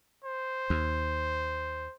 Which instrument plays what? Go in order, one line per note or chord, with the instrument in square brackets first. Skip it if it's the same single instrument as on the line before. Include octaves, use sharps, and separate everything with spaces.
[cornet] C5
[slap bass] D#2